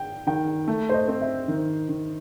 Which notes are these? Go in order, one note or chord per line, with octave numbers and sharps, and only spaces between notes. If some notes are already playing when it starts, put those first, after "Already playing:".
Already playing: G5
D#3 G5
A3
C5
D#5
C4
E5
D#3
D#3